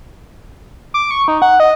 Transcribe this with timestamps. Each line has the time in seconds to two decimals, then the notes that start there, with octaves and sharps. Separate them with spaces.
0.94 D6
1.11 C#6
1.28 D#4
1.42 F#5
1.60 D#5